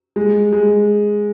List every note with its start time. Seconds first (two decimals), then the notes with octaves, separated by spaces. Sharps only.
0.16 G#3
0.52 G#3